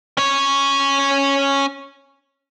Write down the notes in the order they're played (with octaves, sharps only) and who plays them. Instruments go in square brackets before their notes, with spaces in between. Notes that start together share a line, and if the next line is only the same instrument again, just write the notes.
[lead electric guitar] C#4 C#5